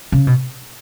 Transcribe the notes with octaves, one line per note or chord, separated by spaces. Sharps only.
C#3
B2